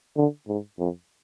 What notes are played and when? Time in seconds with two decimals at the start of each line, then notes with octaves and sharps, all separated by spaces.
0.17 D3
0.48 G#2
0.79 F2